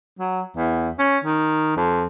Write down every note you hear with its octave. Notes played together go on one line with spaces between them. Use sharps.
F#3
E2
C#4
D#3
F2